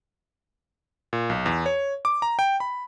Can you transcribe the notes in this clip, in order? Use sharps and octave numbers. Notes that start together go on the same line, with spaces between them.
A#2
B1
E2
C#5
D6
A#5
G5
B5